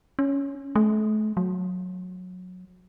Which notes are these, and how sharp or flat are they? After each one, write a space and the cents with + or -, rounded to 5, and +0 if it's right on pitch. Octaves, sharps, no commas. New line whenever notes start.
C#4 +5
A3 -40
F#3 -20